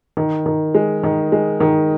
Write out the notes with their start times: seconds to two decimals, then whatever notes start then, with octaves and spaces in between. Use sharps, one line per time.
0.17 D#3
0.46 D#3
0.74 G#3
1.03 D#3
1.32 G#3
1.60 D#3